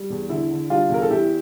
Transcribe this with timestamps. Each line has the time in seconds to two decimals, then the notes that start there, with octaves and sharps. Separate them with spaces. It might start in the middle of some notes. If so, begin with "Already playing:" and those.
Already playing: G3
0.10 E2
0.29 D3 E4
0.50 D3
0.70 G3 D4 F4
0.89 E2 A#4
1.02 A4
1.10 E2 E4 G4